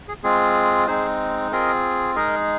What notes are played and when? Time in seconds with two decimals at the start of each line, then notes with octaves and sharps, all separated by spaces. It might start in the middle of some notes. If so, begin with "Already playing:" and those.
0.08 G#4
0.24 G#3 C4 F4 G#4
0.88 G#3 C4 D#4 G#4 C5
1.52 C4 F4 G#4 A#4 D#5
2.15 G#3 D#4 G#4 A#4 D#5